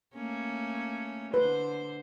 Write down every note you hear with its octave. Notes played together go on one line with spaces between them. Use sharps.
A3 A#3 C#4
D3 B4 C5